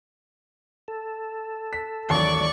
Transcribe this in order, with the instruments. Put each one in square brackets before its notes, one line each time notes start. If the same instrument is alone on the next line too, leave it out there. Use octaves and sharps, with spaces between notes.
[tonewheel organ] A4
[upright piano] B6
[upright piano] A1 D#2 [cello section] F#3 D5 [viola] C#6